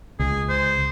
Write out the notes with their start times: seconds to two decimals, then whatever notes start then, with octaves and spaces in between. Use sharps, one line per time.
0.19 C#2 G#4
0.49 C5